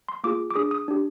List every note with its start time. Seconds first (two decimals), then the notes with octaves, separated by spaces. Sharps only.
0.08 C6
0.24 A#3 F4 G#4 D6
0.51 D6
0.55 D4 G#4 D#6
0.71 D#6
0.88 D4 G4